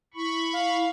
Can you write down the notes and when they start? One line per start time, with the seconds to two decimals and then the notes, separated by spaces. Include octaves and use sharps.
0.14 E4 B5 C#6
0.53 F5